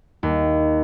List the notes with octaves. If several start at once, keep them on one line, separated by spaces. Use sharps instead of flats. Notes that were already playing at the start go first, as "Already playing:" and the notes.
D#2